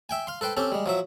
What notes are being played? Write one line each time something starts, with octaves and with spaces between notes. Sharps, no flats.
E5 G5 G#5
F5 C6
A4 B4 C5 G5
C4 C#4 G4 A4
G3 G#3
F3 F#3 E5